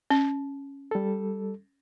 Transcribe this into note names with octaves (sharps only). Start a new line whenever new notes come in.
C#4
G3 A4